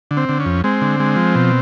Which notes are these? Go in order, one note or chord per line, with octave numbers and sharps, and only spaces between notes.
D3
C4
D3
C#4
F2
G#3 C4
D3
G#3
F3
B2